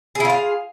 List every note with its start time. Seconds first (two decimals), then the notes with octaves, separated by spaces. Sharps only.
0.15 G#4
0.20 E4
0.25 F4
0.30 F5